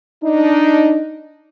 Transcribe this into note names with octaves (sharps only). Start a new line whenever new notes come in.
D4 D#4